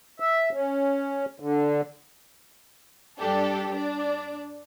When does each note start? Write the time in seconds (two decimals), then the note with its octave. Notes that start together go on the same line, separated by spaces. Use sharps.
0.20 E5
0.53 C#4
1.40 D3
3.19 G2 D4 G4 A4
3.72 D4 D5